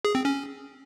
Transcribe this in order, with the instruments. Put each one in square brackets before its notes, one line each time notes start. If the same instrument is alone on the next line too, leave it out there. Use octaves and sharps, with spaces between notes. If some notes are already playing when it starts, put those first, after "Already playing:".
[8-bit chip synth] G#4
C4
C#4